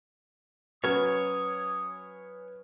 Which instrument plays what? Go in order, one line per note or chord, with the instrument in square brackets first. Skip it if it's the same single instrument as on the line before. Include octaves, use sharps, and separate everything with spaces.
[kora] F#3 [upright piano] C#4 B4 F6 [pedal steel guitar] C#5 G#5 [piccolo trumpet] D#6